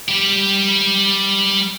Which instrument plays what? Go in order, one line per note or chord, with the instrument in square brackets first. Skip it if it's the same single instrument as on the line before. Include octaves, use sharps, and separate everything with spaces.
[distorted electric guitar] G3 G4